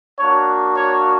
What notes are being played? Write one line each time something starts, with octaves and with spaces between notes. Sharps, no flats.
A#3 D4 F#4 C#5
C#5